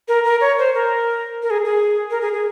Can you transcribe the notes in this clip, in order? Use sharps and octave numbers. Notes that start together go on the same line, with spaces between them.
A#4
A#4
C#5
C5
A#4
A#4
G#4
G#4
A#4
G#4
G#4